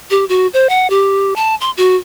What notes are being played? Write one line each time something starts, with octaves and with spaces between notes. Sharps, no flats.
G4
F#4
C5
F#5
G4
A5
C6
F#4